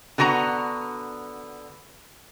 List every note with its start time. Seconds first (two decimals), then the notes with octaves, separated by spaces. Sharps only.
0.18 D3 B3 F#4 G#5 A#5